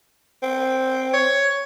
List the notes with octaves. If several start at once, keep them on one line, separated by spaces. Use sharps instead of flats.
C4
C#5